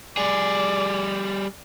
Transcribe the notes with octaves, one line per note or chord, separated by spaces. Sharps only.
G3 G#4 D5